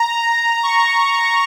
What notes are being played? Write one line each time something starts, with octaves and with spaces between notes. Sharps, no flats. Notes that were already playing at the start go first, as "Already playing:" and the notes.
Already playing: A#5
C#6